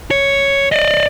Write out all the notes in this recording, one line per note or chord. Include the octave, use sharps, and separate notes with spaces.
C#5
D5 D#5